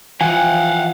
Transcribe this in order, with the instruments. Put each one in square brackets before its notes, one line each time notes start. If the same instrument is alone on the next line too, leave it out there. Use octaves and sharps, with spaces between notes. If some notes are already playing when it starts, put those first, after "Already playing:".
[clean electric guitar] E3 F3 [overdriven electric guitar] F5 F#5 [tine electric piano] G#5